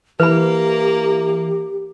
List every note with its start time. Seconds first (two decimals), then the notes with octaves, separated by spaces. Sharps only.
0.20 E3 A#3 G4 B4 B5